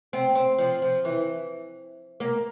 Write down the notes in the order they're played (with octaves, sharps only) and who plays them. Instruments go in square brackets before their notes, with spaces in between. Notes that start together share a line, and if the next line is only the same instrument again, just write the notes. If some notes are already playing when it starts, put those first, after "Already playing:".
[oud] C4
C4
F3
F3
E3
A#3